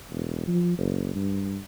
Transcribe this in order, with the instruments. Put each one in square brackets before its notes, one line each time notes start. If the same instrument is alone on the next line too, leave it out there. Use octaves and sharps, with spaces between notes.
[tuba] E1
F3
F#1
G2